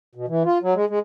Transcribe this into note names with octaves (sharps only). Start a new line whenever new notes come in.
B2
E3
F4
F#3
G#3
G#3